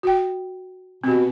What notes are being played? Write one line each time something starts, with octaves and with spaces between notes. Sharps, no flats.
F#4 G5
B2 C4 G4